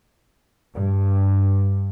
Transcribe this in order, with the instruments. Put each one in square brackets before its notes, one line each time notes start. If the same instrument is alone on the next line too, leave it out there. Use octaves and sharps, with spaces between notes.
[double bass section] G2